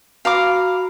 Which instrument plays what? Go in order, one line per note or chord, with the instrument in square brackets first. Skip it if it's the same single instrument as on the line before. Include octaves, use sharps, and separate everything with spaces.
[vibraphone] F#4 B5 [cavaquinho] F5 A#5 D6